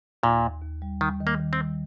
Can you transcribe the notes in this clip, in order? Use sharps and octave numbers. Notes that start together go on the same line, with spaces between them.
D#2 A#2
D#2
D#2
G3
D#3 G3
D#3
A#3
D#3
C4
G3